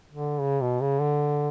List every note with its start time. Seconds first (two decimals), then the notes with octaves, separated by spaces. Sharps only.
0.11 D3
0.41 C#3
0.61 B2
0.81 C#3
1.01 D3